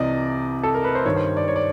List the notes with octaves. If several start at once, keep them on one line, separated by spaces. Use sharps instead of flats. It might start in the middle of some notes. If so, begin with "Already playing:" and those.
Already playing: C2 C3 E3 D5 D#5
A4
A#4
B4
C5
G2 D#3 C#5
C5
D5
C#5
D5